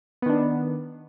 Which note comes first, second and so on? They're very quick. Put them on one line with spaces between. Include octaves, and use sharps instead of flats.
B3 D#3 D4